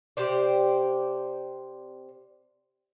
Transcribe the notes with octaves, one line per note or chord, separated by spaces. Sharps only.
C3 G4 C5 D5